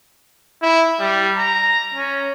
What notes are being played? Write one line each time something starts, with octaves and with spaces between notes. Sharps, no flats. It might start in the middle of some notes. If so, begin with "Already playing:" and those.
E4
G3
A#5
C#4